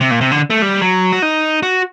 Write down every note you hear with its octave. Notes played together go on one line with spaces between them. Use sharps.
C3
A#2
C3
D3
A3
G3
F#3
F#4
D#4
F#4